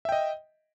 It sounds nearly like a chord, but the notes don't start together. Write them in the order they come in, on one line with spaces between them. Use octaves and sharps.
E5 G5 D#5